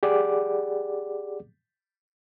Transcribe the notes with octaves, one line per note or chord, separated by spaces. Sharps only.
G4 G#4 D5 F#5 D6